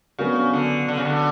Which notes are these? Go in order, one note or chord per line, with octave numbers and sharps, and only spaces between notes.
C#3 F#3 B3 D4 F#4
D3
D3
C#3
D3